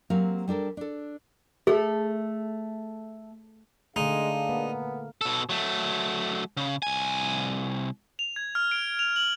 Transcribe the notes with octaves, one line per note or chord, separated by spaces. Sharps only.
F#3 A#3 C4 G4 F5
G3 D4 A4 A#4
D4 A4
A3 G#4
D3 G#3 A3 D4 D#4 G#4 F5
A#3 B3
B2 A4
F#3 A3
C#3
C2 G#5
F7
G#6
F6
D7
F7
F#7